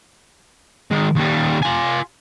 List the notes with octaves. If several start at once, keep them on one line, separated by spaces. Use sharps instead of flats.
D#3 G#3
D#2 G3
F4 G#5